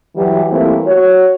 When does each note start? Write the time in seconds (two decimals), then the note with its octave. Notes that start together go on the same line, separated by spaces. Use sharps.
0.16 E3 F#3 G3
0.50 E3 G3 A3 A#3 C4 E4
0.87 F#4 C#5